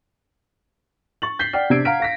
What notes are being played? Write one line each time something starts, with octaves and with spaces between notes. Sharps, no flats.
C#6 A6 F#7
G6 B6 C7 G7
D5 F#5 G5 F6 C7
C3 D4 E6 G#6 C7 D7
F5 F#5 A#5 F6 B6 D7
F5 A#6 B6